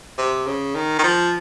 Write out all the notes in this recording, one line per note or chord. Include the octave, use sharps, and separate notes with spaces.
C3
C#3
D#3
D#3
F3